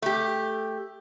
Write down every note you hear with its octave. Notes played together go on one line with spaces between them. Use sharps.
A3 G4